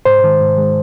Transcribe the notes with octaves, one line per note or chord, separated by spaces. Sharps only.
G#2 C5
D#3 G#3
G#2
D#3 G#3